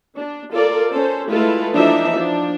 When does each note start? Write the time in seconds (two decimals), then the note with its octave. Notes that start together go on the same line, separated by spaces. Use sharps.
0.18 D4
0.53 F4 A4 A#4 D5
0.91 C#4 A4 C5
1.30 G#3 A3 E4 F4 A4 B4
1.74 E3 F3 D4 D#4 E5
2.14 F3 D4